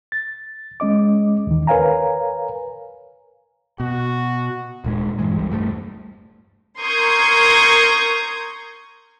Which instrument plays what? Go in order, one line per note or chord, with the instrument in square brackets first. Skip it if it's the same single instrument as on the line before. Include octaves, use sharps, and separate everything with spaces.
[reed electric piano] A6
G#3 C#4 D#5 D6
D#2 D#3
A#4 B4 C#5 F5 G#5 A#5
[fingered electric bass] B2 [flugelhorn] F#4
[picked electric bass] D#1 A#2 G#3
G2 E3 G#3
G1 C#2 G3
E1 G2 A#2 A3
[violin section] A#4 C6 C#6 D#6 G6 G#6